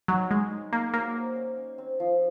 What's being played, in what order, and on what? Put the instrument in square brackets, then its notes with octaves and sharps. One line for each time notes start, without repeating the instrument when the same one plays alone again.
[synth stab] F#3 [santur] D#4
[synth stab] G#3 [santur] G#4
[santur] D#4
[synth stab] A#3 [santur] D#4
[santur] F#3 [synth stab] A#3
[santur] C5
C#4
C#4
C4
F3